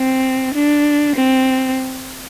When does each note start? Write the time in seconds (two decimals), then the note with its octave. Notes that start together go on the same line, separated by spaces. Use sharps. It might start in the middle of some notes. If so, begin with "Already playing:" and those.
Already playing: C4
0.54 D4
1.16 C4